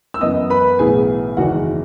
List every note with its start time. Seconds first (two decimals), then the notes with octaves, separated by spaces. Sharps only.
0.14 E6
0.21 F#2 E3 B3 D#5 D#6
0.50 B4 B5
0.79 B1 A2 E3 B3 G#4 G#5
1.37 F#1 E2 D#3 G#3 F#4 F#5